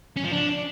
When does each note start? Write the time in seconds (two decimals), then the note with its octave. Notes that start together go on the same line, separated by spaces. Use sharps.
0.17 C#4
0.24 F3
0.31 D4